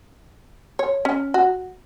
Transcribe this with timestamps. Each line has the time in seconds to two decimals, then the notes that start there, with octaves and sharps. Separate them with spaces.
0.79 C#5
1.05 C#4
1.34 F#4